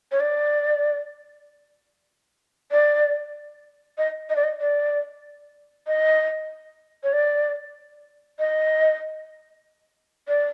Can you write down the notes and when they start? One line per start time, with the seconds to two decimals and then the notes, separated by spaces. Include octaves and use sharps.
0.12 C#5
0.20 D5
2.72 D5
3.98 D#5
4.29 D#5
4.36 D5
4.44 D#5
4.61 D5
5.87 D#5
7.04 C#5
7.13 D5
8.39 D#5
10.28 D5